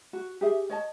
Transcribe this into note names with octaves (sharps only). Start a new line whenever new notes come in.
F#4
G4 G#4 E5
C#5 D#5 A5